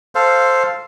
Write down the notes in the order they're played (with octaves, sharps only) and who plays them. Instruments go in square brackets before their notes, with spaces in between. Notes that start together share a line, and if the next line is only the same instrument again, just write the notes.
[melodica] A4 C5 F5